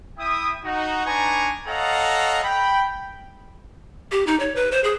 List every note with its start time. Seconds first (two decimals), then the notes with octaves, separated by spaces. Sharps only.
0.18 E4 E5 G5 D#6
0.64 D#4 F#4
1.05 D4 D#4 B4 G#5 A#5 C#6
1.67 A4 C#5 D#5 F5 F#5 A#5
2.43 G5 B5
4.12 G4
4.27 D#4
4.40 C#5
4.56 B4
4.72 C5
4.84 G#4